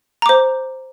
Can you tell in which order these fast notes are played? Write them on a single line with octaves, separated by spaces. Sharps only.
A#5 D6 C5